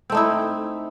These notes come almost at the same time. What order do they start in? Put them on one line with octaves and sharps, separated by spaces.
C4 A3 D#4 E4